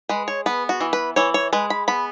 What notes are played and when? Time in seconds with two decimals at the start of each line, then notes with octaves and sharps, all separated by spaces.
0.09 G#3 B4
0.28 C#5
0.46 B3 B4
0.69 F#4
0.81 E3
0.93 B4
1.16 E3 C#5
1.34 C#5
1.53 G#3 B4
1.70 B5
1.88 B3 B5